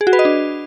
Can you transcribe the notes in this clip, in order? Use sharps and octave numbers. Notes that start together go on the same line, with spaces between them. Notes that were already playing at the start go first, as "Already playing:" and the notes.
G#4
F#4
B4
D#5
D4